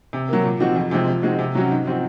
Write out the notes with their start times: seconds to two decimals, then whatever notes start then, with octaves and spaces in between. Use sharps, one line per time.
0.13 C3
0.29 F#3 A#3
0.44 A#2
0.60 F3 C4 D#4 F#4
0.76 F2
0.91 C3 F3 G#3 C4
1.08 F3
1.23 G#3 C4 D#4 F#4
1.39 C3
1.55 F#3 C#4 F#4
1.71 G#2
1.86 F3 C4 D#4 F#4